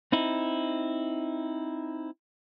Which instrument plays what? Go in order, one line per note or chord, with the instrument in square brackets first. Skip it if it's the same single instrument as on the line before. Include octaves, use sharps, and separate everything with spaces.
[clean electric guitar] C4 D#4 E4